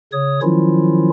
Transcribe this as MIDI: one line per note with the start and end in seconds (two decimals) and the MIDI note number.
0.13 0.40 49
0.13 0.40 73
0.13 0.40 87
0.42 1.09 51
0.42 1.09 53
0.42 1.09 54
0.42 1.09 61
0.42 1.09 64
0.42 1.09 65